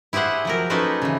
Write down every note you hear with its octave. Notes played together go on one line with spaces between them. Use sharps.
E4 G4 G#4 C5 F#5
F3 F#3 A#4
A#3 C#4 D#4 A4 B4 C5
C#3 E3